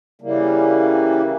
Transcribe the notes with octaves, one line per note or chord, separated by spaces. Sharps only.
C#3 E3 G3 A#3